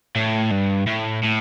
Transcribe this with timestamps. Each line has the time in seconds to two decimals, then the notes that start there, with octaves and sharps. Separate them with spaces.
0.16 A2
0.51 G2
0.87 A2
1.23 A2